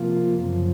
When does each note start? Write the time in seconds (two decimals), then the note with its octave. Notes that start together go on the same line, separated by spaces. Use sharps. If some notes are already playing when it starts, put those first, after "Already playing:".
Already playing: C3 F3 A#3 F4
0.34 F#2 C#3 F3